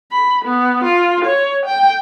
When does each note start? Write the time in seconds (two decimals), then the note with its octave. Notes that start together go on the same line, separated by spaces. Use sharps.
0.12 B5
0.45 B3
0.84 F4
1.25 C#5
1.66 G5